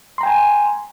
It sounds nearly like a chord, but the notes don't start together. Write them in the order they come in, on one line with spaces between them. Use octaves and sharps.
C6 A#5 G5 G#5